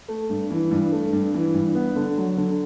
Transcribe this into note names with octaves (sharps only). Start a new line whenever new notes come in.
A3
G2
E3
G2
A3
G2
E3
G2
B3
D3
F#3
D3